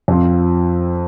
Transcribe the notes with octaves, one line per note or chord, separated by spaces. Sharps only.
F2 F3 C4 F4